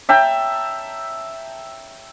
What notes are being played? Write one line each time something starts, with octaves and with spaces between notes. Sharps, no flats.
E5 G5 A5 A#5